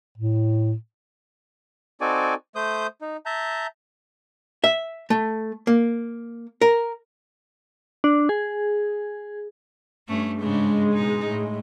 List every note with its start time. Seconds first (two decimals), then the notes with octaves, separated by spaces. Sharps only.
0.17 A2
2.01 C4 D#4 F#4 A4 D5 G#5
2.55 A3 C5 D#6 G6
3.01 D#4
3.26 E5 A5 A#5 G6
4.64 E5
5.10 A3
5.67 A#3
6.61 A#4
8.04 D4
8.29 G#4
10.08 G2 A3 C#4
10.41 G#2 C#3 G#3 D4
10.93 B2 D#4
11.26 A2